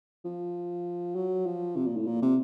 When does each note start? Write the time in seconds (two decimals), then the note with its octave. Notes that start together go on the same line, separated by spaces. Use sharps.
0.25 F3
1.16 F#3
1.46 F3
1.77 C3
1.86 A#2
1.97 A2
2.07 A#2
2.22 C3